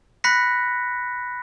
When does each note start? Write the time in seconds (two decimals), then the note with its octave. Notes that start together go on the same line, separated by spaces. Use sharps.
0.24 B5 F#6 A#6 B6 C#7